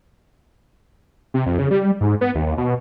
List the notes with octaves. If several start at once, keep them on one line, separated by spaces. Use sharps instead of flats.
C3
F2
C#3
G3
G#2
B3
D#2
D#2
B2